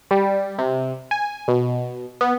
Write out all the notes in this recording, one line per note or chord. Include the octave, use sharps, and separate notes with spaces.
G3
C3
G#5
B2
B3